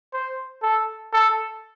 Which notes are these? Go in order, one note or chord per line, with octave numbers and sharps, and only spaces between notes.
C5
A4
A4